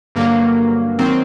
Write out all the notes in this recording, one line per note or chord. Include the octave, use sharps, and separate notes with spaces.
G2 D3 F#3 A#3
D#3 F#3 C4